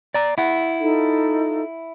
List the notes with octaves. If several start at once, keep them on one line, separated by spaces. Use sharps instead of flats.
D5 A#5
E4 F#5
D#4 F4 A4